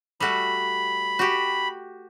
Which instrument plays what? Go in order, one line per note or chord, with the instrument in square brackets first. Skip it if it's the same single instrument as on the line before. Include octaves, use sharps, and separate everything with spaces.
[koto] G3 A3 F#4 [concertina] B5
[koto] F#4 G4